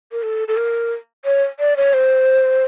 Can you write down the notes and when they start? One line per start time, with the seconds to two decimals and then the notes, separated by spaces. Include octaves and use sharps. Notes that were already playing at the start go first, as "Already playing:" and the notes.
0.12 A#4
0.23 A4
0.48 A4
0.57 A#4
1.25 C#5
1.60 D5
1.77 C#5
1.94 C5